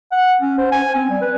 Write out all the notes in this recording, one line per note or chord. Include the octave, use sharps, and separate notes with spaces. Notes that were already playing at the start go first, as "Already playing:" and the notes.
F#5
C#4
C5
G#5
C4
G3
B4